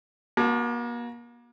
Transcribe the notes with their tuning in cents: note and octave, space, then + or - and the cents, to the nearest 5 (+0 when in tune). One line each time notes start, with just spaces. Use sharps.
A#3 +40 F#4 +0 A5 +0